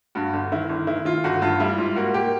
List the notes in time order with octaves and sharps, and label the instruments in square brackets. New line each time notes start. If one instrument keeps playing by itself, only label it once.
[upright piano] G2 F#4
G1
D#3 E4
G1
D#3 E4
D#3 F4
G1 F#4
G2 F4
G3 E4
G#2 F4
A#3 F#4
A#3 G4